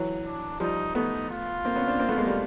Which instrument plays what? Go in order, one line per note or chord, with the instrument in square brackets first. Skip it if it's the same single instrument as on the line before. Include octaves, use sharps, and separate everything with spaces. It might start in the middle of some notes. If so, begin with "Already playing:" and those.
Already playing: [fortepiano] E3 F#3
[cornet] D4
[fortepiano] F3 G3 [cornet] D#4
[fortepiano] A3 B3 [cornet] D#4
[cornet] F4
[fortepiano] A#3 C4
B3 C#4
C4 D4
A#3 C4
A3 B3
G#3 A#3
G3 A3